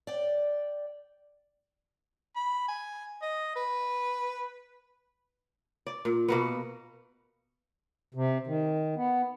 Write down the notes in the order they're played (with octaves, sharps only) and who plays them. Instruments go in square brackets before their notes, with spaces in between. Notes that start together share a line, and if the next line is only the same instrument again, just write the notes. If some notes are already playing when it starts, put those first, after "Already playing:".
[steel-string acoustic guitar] D5 G5
[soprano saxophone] B5
G#5
D#5
B4
[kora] D5
A#2
B2 A#3 B3
[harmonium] C3
D#3
B3